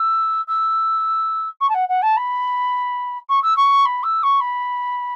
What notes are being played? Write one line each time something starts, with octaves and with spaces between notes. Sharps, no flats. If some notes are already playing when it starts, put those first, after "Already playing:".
Already playing: E6
E6
C#6
A5
F#5
F#5
A5
B5
C#6
E6
C#6
B5
E6
C#6
B5